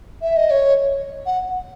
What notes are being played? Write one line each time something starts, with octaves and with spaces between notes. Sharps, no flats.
E5
D#5
C#5
F#5